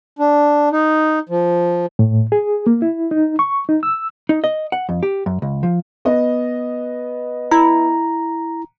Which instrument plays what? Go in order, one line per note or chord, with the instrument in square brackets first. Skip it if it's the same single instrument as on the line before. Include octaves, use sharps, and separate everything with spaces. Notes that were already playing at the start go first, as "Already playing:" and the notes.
[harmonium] D4
D#4
F3
[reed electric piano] A2
G#4
A#3
E4
D#4
C#6
D#4
E6
[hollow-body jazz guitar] D#4
D#5
F#5
F2
G4
F#2
C#2
F3
[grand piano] B3 D#5
[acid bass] E4 [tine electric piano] A#5